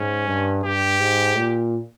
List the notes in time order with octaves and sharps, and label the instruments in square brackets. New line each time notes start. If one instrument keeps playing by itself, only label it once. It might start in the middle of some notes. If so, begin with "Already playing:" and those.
Already playing: [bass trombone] G#2 [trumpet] C#4
[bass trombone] G2
[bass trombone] G2 [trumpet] G4
[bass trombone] G#2
A#2